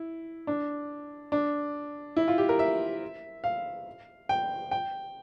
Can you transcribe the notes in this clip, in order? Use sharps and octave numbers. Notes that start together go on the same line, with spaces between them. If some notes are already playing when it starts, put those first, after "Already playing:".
Already playing: E4
D4
D4
E4
F4
G4
A#4
E5
F5
G5
G5